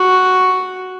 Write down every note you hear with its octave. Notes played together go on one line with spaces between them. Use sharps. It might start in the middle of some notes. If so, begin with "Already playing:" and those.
Already playing: F#4